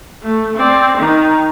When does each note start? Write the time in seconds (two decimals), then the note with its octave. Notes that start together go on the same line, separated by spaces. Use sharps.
0.23 A3
0.56 C4 D5
0.97 D#3 D#4